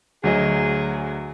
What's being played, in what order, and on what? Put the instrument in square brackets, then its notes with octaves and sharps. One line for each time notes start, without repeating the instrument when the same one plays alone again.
[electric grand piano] D2 F#3 D#5 [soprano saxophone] G#4